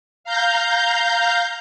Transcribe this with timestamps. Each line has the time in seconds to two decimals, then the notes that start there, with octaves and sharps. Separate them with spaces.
0.24 F5 A#5 G6